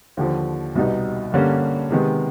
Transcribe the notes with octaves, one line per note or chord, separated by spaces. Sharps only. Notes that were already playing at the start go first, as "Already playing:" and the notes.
D#2 D3 F3
C2 B2 G3 B3 D#4
G2 D3 G3 A#3 C#4
C3 D#3 G#3 B3